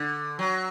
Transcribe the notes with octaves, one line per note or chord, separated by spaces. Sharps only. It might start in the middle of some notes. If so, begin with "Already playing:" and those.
Already playing: D3
F#3